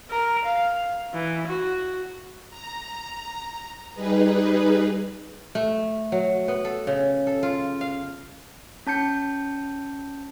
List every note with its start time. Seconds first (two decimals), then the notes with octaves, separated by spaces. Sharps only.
0.10 A#4
0.45 F5
1.13 E3
1.47 F#4
2.50 A#5
3.95 G3 D#4 G#4 B4
5.55 A3
6.12 F#3
6.48 B3
6.65 A4
6.87 C#3
7.27 A4
7.43 F4
7.81 F5
8.87 C#4 A5 G6 C#7